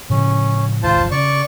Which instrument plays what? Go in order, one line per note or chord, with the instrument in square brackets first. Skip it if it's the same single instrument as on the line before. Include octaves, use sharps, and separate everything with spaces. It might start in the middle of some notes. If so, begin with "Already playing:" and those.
[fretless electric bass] A2 C#3 F3 [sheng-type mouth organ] C#4
[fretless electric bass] C2 G#2 D#3 [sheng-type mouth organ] F4 C5 A5
[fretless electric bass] E1 F2
[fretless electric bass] C#3 [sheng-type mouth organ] D5 C#6